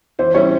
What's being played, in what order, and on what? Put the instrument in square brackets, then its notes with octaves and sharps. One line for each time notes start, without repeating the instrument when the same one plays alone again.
[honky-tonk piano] E3 [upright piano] C5
[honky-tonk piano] G3 C#4 E4 [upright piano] C#5